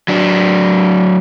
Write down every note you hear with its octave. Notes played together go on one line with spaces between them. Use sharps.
F#3 D4